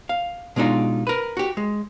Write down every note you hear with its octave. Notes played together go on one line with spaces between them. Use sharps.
F5
B2 G#3 D4 D#4 F4
A#4 B4
F#4 G4
G#3